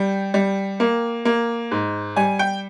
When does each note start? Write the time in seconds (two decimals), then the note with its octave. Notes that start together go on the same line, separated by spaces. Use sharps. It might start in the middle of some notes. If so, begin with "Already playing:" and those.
Already playing: G3 G5
0.34 G3
0.80 A#3
1.25 A#3
1.71 G#2
2.16 G3 G#5
2.39 G5